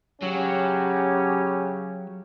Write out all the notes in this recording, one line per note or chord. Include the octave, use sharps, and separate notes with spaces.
C#3 F#3 C#4 G4